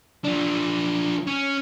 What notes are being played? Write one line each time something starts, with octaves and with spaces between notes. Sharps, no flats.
F3 D4
C#4